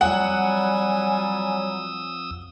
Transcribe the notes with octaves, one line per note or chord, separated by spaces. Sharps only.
F2 F#3 G3 F#5 G#5 D#6 E6